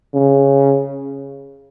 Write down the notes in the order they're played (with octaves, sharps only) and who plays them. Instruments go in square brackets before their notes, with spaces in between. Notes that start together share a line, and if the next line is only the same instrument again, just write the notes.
[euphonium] C#3